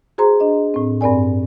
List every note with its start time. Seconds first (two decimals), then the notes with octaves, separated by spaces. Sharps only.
0.18 F#4 G#4 C5 A#5 C6
0.40 D4 D#5
0.74 A2 C4
1.01 G2 C4 A#4 D5 G#5